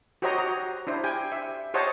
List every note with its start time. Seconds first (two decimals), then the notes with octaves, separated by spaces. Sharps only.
0.22 F#4 G4 C5 C#5 D#5 A#5
0.38 F#4 A#5
0.87 D4 E4 C5
1.04 G4 G5 G#5
1.32 E5
1.74 G4 C5 C#5 D#5 F#5 A5